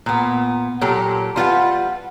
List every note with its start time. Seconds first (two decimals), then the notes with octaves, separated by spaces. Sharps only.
0.06 A#2 B3
0.81 A#2 F#3 G4 A4
1.36 G3 F4 B4 F#5